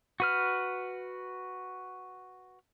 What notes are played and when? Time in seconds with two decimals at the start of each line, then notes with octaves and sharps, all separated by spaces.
0.20 F#4 B4 F6